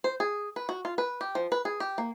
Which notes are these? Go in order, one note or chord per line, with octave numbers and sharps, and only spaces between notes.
C5
G#4
B4
F#4
F4
B4
G4
F3
B4
G#4
G4
A#3